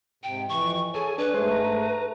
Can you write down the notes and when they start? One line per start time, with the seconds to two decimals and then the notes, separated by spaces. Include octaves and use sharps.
0.23 G#2 C3 G5
0.49 F2 E3 C#6
0.94 G#4 A4 C#5 G#5
1.18 D4 B4
1.34 G#2 G#3 A3 G#4 C5
1.51 A#5